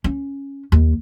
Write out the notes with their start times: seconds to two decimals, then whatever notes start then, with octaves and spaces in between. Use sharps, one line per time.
0.04 C#4
0.72 D#2